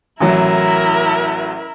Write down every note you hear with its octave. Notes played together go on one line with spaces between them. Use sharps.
A1 F#3 E4 A#4